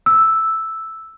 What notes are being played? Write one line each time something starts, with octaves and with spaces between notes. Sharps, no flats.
E6